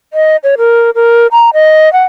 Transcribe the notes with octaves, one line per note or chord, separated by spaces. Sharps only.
D#5
C#5
A#4
A#4
A#5
D#5
F#5